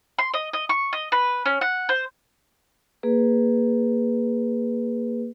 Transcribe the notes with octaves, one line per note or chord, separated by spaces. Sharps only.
C6
D#5
D#5
C#6
D#5
B4
C#4
F#5
C5
A#3 G#4 B4